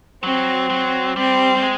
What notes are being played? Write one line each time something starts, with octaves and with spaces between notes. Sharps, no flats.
F#3 C4
F#3
G3 C4
G3
G#3